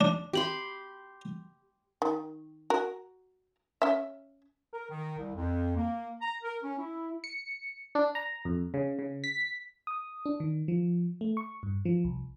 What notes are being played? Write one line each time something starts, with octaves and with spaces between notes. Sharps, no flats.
D4
G4 B5 C6
D#3
F#4 A#4
C#4 E5
A#4
D#3
C2
F2
A#3
A#5
A#4
C#4
E4
C#7
D4
A#5
F2
C#3
C#3
B6
D#6
D4
D#3
F3
A3
C#6
G2
F3
C2